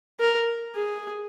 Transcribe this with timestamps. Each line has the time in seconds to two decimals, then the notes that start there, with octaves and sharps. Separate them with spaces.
0.20 A#4
0.76 G#4